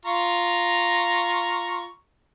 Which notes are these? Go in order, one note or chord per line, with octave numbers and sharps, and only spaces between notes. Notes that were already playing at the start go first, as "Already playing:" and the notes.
F4 A#5 C#6